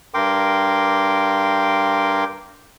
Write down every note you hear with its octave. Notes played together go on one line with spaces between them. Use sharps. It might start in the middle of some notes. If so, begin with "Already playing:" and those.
G2 A#4 G5 C6 D6